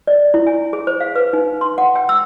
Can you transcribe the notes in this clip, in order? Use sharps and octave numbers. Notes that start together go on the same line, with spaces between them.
D5
E4
G#5
G#4
C5
F5
B4
D#4
C6
F#5
G5
E6